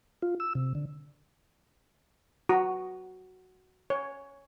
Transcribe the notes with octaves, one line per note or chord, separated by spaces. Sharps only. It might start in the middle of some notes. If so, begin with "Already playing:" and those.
F4
E6
C3
D3
F#4
C#5